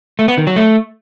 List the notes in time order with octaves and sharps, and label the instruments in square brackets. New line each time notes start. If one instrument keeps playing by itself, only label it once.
[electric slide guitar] A3
B3
D#3
F#3
A3